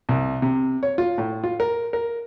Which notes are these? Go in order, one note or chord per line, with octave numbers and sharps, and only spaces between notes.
C2
C3
C#5
F4
A2
F4
A#4
A#4